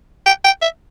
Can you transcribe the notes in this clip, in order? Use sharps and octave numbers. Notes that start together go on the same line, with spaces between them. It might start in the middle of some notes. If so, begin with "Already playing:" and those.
G5
G5
E5